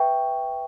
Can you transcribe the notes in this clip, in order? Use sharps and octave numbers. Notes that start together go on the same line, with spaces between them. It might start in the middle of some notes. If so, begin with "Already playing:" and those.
Already playing: B4 E5 G5 C#6